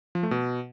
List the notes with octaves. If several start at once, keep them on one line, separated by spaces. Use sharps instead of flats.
F3
A3
B2